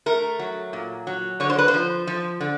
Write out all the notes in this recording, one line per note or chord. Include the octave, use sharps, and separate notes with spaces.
A3 A#4
F#3
A#2
F#3
D3 C#5
C5
B4
C5
F3
F3
D3